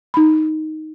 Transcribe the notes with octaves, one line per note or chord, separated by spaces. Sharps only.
D#4 B5